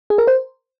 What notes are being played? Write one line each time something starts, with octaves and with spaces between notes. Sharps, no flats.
G#4
A#4
C5